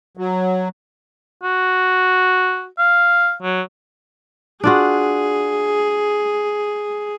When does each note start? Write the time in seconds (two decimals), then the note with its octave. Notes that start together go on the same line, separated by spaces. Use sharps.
0.17 F#3
1.43 F#4
2.78 F5
3.42 F#3
4.64 D4 F4 F#4 G#4